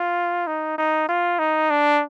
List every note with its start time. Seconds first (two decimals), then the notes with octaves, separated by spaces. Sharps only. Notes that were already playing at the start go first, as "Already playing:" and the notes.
Already playing: F4
0.47 D#4
0.78 D#4
1.09 F4
1.39 D#4
1.70 D4